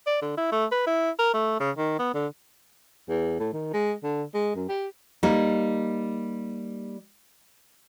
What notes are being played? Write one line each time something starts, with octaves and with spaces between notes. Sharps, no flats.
D5
D3
E4
A3
B4
E4
A#4
A3
C#3
D#3
B3
D3
E2
A2
D#3
G#3
D3
G#3
F#2
G4
G3 A#3 D#4